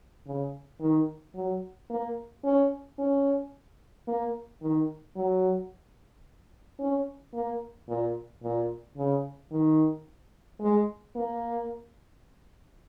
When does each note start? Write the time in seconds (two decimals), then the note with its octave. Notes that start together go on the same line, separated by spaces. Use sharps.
0.26 C#3
0.81 D#3
1.35 F#3
1.90 A#3
2.44 C#4
2.98 C#4
4.08 A#3
4.62 D#3
5.16 F#3
6.79 C#4
7.34 A#3
7.88 A#2
8.43 A#2
8.97 C#3
9.51 D#3
10.61 G#3
11.15 A#3